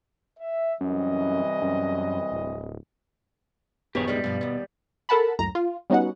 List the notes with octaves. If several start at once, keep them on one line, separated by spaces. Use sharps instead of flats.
E5
C2 F#2 E3 D#5
F#2
D1
A#1 F#2 D#3 B3 G4 G#4 C#5
C3 D#3 G3 G#3
G2 B2 F3
D#2 B3
A4 A#4 F#5 A5 B5
C#2 F#2 A2 A#5
F4
G3 B3 C#4 D#4 F#4 F#5